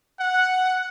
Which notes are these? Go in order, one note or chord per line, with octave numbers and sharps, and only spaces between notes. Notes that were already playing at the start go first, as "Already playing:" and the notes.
F#5